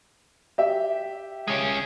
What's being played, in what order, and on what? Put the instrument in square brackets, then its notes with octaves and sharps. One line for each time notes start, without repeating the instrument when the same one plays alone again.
[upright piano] G4 E5
[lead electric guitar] G#3 C#4